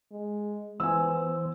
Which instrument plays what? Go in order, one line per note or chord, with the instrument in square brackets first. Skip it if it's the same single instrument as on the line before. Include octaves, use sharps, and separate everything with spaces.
[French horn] G#3
[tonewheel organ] E3 C5 [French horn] B3 [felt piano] G#5 E6